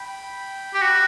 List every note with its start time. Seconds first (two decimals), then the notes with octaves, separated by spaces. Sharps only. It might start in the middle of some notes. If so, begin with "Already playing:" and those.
Already playing: G5 B5
0.74 G4
0.81 F#4